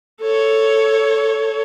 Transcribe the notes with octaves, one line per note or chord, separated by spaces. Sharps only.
A4 C#5